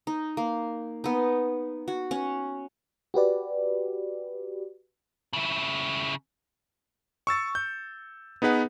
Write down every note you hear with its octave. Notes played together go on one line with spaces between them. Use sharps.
D#4
A#3
B3 D#4
F#4
C#4 F#5
F#4 G4 B4 D5
C#3 E4
C#6 E6 A6 C#7
G6
B3 D#4 G#4 B4 F#5